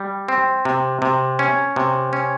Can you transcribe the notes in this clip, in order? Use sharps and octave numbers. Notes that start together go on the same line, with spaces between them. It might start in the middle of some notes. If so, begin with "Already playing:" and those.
Already playing: G3
C4
C3
C3
C#4
C3
C#4